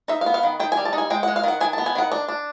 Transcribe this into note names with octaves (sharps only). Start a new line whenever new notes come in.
D#4 E5
F5
B3
F5
D#3
D#3 G5
G#5
G3
A5
D#4
G#5
G#3 G5
F#5
G#3
F5
D#3 F#5
D#3 G#5
A5
B3
G#5
D#3 F#5
D4
D4